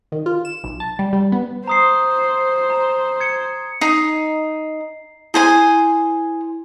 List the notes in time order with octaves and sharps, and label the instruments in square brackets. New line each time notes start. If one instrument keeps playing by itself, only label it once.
[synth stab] D#3
F4
E7
B1
A5
G3
G3
B3
[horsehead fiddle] C5 [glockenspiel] A#5 D#6 C7
[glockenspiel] A#5
G#6 C#7
[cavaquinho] D#4 [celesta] C7
[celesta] E4 [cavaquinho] G#4 C5 G#5